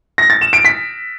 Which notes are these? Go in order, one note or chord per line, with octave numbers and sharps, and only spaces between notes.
A#6
A6
E7
D7
B6